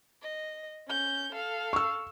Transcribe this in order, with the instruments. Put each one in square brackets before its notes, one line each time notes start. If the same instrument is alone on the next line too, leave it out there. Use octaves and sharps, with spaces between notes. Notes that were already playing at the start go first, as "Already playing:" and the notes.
[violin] D#5
C#4 G6
A4 F5
[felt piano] C#6 E6